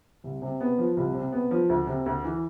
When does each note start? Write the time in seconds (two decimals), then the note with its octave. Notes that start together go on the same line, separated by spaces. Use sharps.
0.24 C2
0.42 C3
0.61 B3
0.78 F3
0.97 C2
1.14 C3
1.33 B3
1.51 F3
1.69 D2
1.87 C3
2.06 D2
2.24 E3